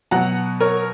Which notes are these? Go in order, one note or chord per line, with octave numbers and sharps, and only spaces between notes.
B2 F#3 F#5 A#5
A#4 C#5